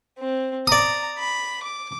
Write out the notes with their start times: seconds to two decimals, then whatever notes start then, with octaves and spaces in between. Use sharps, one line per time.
0.19 C4
0.67 D5 A#5 D#6
1.18 B5
1.63 D6